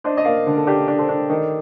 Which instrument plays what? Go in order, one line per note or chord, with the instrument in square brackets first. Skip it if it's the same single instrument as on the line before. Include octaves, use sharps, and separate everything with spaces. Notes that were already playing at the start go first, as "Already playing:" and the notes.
[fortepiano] D4 C5 D#5
D#5
A#3 D5 F5
D3
A4
D4 G4 A#4
D4
A4 C5
D4
D#3